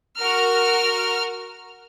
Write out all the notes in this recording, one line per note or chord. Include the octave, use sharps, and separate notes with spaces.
F#4 A#4 F6